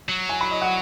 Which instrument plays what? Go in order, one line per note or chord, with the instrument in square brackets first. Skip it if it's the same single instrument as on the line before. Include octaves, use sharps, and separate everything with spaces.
[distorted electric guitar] F#3
[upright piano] G#5
B5
D#5
F#5